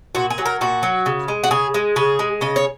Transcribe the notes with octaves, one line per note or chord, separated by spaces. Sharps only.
A#2 F#4
G#4
F#3
A#4
A#2 F#4
F#3
C#3
G#3
F#4
C#3 G#4
G#3
C#3 G#4
G#3
C#3 D#5
C#5